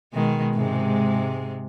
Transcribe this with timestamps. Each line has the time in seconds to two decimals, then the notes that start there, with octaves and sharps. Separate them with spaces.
0.13 B2 D#3 G#3
0.55 G#2 C3 G#3